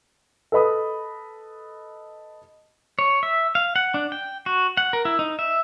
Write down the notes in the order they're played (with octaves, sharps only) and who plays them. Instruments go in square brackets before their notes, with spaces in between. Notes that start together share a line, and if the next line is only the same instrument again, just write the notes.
[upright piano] A4 B4 D#5 B5 D#6
[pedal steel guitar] C#5
E5
F5
F#5
D4
G5
F#4
F#5
A#4
E4
D#4
E5